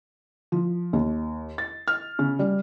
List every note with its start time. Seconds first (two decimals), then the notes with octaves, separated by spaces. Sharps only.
0.52 F3
0.93 D#2
1.58 A6
1.88 F6
2.19 C#3
2.39 G3